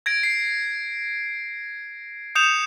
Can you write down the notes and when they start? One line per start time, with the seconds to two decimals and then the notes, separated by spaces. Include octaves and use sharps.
0.06 G#6 A#6 D7
0.23 C7
2.35 D#6 G6 C#7 E7 F7